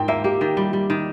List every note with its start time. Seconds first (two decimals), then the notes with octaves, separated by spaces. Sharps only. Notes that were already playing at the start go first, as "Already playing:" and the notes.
Already playing: G#2 G5
0.08 A#3 E5
0.24 A#3 G4
0.41 D#3
0.57 G3
0.73 G3
0.90 D#3